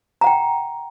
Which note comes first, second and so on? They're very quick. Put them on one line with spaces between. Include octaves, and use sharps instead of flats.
A#5 F#5 G5